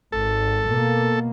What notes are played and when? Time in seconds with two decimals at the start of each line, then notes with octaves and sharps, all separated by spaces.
0.12 G#1 A4
0.68 B2 A#3